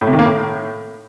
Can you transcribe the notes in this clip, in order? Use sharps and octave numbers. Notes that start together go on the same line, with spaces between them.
A2
C3
D#3
A#3
A2